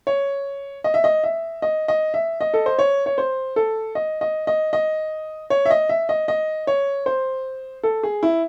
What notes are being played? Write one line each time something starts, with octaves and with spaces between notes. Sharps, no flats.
C#5
D#5
E5
D#5
E5
D#5
D#5
E5
D#5
A4
C5
C#5
C#5
C5
A4
D#5
D#5
D#5
D#5
C#5
E5
D#5
E5
D#5
D#5
C#5
C5
A4
G#4
E4